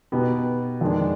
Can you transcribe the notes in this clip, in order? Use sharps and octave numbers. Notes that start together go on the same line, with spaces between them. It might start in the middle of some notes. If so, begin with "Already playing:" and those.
B2 B3 D#4 G4
F2 D#3 G#3 D4